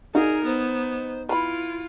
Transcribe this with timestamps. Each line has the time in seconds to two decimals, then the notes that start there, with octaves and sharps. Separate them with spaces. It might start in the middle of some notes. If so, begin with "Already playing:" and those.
0.15 D#4 F#4 G#4 A#4 D5 F5
0.45 B3 C5
1.29 E4 F4 B4 A#5 B5